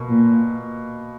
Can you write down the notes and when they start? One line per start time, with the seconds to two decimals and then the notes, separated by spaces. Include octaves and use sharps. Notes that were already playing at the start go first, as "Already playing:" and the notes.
Already playing: B2 A#3
0.09 A#2